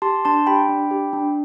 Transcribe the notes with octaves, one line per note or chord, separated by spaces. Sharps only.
G4 A5 C6
D4 A5 C6
G4 G5 B5
D4
G4
D4